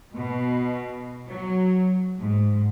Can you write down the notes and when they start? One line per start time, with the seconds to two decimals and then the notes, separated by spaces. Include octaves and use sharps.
0.14 B2
1.28 F#3
2.19 G#2